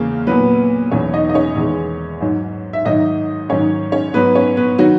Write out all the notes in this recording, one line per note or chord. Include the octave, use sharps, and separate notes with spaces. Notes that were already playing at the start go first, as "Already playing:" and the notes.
Already playing: E2 C#3 G#3 A#3
A#2 F#3 B3 B4
E2 B2 F#3 C#4 C#5
D#4 D#5
D#5
C#4 C#5
E2 D#3 G#3
G#2 F#3
E5
G#2 D#3 F#3 D#4 D#5
G#2 D#3 F#3 C#4 C#5
C#4 C#5
G#2 F#3 B3 B4
C#4 C#5
B3 B4
D#3 F#3 F#4